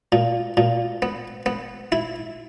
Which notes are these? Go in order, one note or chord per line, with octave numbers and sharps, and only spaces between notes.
A#2
A#2
B3
B3
E4